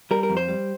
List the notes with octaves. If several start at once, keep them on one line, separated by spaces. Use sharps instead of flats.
G3 A#4
A#4
F2
C5
G3